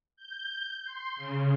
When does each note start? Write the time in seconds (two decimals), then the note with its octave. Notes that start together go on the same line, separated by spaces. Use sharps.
0.17 G6
0.85 C6
1.16 C#3